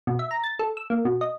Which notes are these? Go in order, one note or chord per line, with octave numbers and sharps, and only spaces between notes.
B2
E5
A#5
A6
A4
E6
A#3
B2
D#5